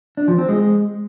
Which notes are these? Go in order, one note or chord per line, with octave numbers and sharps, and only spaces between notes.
D4
F3
C4
G#3